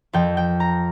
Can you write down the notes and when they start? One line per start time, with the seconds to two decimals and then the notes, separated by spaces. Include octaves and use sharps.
0.13 F2 F3 G5
0.37 G5
0.60 A#5